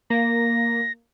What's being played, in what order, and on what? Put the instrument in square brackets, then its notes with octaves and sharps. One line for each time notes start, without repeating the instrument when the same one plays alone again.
[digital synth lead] A#3 [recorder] A#6